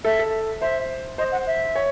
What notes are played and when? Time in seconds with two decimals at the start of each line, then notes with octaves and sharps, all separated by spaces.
0.04 A4 E5
0.19 A4
0.61 C5 E5
1.18 C5 D#5
1.32 F#5
1.47 E5
1.76 C#5